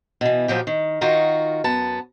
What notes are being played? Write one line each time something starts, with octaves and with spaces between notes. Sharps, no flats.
B2 E3
A#2 F3 F#3 G4
D#3
D#3 F4 F#4 A#4
F#2 B3 A5